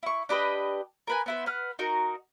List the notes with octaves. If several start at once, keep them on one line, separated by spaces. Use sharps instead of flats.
E4 C#6
D4 G4 B4 D#5
A#4 B4 G#5
B3 E4 C5
B4 F#5 F6
D#4 F#4 A#4